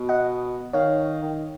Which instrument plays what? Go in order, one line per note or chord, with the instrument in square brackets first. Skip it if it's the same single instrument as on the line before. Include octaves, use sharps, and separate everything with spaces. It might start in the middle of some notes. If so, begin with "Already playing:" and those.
Already playing: [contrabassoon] B2
[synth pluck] D#5 F#5
[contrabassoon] D#3 [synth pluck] C#5 F5
[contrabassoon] D#3